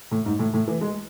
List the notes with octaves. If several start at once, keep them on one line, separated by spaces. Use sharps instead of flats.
A2
G#2
A2
A2
E3
G#3